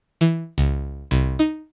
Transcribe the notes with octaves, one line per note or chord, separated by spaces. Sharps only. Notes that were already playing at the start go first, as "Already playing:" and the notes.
E3
C#2
C2
D#4